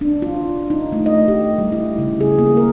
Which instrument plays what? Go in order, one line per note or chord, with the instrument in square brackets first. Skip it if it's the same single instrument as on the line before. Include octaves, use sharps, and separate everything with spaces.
[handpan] D4
F4
D#4
A3
D#5
G4
G3
E4
C#3
G#4
A#3
A#4